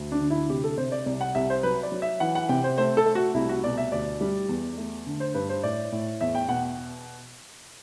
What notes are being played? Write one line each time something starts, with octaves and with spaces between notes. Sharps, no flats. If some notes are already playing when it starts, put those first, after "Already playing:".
Already playing: D2
D4
D3
E4
C3 G4
A4
C3 C5
D5
C2 D5
F#5
C2 E5
C5
F#3 B4
D5
F#3
E5
E3 F#5
F#5
C3 G5
C5
A3 C5
A4
A3
F#4
C2 E4
F#4
B2 D5
E5
D2 D5
G3
E2
A3
D3
C5
G2 B4
C5
A2 D5
A2
E2 E5
G5
B2 F#5